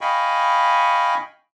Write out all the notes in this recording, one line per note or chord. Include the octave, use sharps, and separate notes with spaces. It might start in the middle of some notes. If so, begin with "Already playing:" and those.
D#5 F5 G5 G#5 B5 C#6